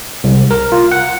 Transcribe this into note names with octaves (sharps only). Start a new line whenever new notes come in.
C2
A#4
F4
F#5